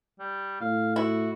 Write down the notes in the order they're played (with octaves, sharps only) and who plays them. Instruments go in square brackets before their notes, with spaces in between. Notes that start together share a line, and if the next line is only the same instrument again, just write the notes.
[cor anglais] G3
[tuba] A2 [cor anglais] F5
[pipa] E4 [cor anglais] F#4